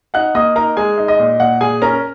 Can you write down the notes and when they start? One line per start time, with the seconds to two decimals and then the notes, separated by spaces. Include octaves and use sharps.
0.14 D#4 F#5 F#6
0.35 A#3 D#5 D#6
0.56 D#4 A#4 A#5
0.77 G#3 G#4 G#5
0.98 D#4
1.08 D#5
1.19 A#2
1.40 A#2 F#5
1.61 A#2 G#4 G#5
1.82 C#4 A#4 A#5